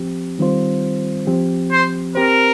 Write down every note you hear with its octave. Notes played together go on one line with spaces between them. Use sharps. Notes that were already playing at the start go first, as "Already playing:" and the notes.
Already playing: F3 C4 G4
D#3 G3 C4 F4 C5
F3 C4 G4
C5
C4 G4 A#4 C5